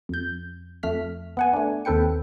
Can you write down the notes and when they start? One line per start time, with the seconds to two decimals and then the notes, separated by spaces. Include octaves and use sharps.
0.09 F2 G6
0.83 F2 A3 F6 B6
1.37 B3 F#5 G#5
1.53 A3 D4
1.85 D#2 C4 A4 B4 G5 C#7